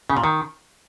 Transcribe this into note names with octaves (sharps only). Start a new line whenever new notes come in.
C#3
A#2
D#3